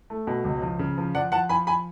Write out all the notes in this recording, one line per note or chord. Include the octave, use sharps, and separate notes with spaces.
A3
B2
C#2
F3
C#3
F3
F3 D5 F#5
F3 F#5 A5
F3 G#5 B5
G#5 B5